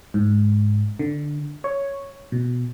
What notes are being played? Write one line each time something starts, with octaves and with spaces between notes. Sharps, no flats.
G#2
D3
C#5
B2